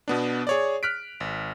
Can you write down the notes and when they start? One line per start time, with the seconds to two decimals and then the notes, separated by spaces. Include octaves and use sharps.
0.08 B2 B3 D4
0.47 G#4 C#5 D5
0.83 F6 F#6 B6 D7
1.20 G#1